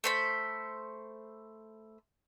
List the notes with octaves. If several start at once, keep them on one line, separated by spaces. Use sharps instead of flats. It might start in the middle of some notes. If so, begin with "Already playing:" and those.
A3 C5 B5